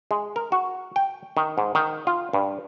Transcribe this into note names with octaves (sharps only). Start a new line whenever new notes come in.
G#3
A#4
F#4
G5
D#3
G#2
D#3
F4
G2